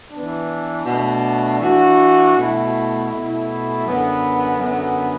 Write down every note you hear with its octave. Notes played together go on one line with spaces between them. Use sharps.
E3 B3 D4
B2 A3 D4
E3 D4 F#4
B2 A3 E4
B2 A3 E4
F#2 D3 B3
F#2 D3 B3